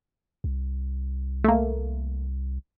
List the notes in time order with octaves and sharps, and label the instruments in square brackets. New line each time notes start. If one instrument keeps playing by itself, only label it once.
[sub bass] C2
[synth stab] A3 A#3